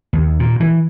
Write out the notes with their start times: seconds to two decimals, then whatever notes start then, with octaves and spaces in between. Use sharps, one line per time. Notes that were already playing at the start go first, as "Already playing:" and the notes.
0.13 D#2
0.40 A#2
0.60 E3